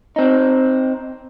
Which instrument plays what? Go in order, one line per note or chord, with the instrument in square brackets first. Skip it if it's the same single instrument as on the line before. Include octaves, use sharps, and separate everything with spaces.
[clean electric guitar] C4 D#4